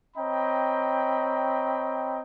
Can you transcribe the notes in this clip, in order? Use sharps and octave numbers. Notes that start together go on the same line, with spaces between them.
C4 C#5 D#5 G5 A#5 B5